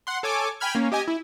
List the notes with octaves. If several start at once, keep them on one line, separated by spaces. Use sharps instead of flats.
F#5 C6
A4 C#5 G#5 D6
G5 G#5 B5 F6 G#6
A#3 C#4
G4 D#5 G#5
E4